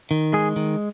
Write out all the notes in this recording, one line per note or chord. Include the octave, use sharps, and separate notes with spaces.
D#3
G#3 G#4
D#3